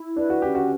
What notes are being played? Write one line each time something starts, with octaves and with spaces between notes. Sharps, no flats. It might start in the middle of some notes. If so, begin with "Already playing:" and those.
Already playing: E4
D4 B4
F#4
C#4 G4
F#4